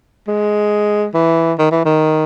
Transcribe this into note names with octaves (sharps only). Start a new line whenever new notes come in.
G#3
E3
D#3
E3
D#3